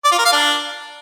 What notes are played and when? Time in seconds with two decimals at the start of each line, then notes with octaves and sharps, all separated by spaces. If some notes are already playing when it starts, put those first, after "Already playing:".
0.05 D5
0.12 F4
0.18 A#4
0.25 F5
0.32 D4